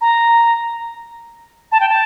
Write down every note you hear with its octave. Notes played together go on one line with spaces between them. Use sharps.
A#5
A5
G5
A5